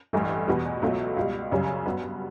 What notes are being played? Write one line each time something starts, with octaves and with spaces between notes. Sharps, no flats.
A1 G2 E3 A3
E2 B2 G3 B3
C#2 B2 F#3 A3
C#2 B2 G3
F#2 C#3 G3 C#4
G2 F#3 B3